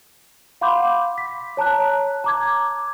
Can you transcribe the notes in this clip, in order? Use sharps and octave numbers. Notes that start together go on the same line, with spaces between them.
F5 F#5 B5 C6 D6 G6
B6
C#5 A5 A#5 F#6
A#5 D6 G#6